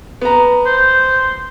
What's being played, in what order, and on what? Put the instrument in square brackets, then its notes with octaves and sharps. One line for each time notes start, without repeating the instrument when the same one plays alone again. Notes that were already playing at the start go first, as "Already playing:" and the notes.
[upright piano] B3 A#5
[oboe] C5